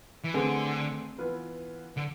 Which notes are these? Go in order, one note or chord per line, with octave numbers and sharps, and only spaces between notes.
E3
D3 A3 C4 G#4 B4
E3 B3 F4 B4
D3